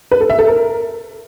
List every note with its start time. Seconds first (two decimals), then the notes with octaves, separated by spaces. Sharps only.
0.11 B4
0.21 A4
0.30 E5
0.39 A4
0.48 A#4